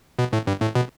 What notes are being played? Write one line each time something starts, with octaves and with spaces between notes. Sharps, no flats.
B2
A2
G2
A2
B2